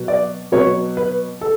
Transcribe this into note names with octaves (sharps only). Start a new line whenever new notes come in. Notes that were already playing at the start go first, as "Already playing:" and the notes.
Already playing: B2 F#3
D5
B2 F#3 C#5
B4
A4